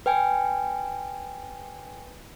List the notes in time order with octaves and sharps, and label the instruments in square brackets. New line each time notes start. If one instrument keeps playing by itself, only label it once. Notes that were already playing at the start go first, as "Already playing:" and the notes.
[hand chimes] B4 G5 G#5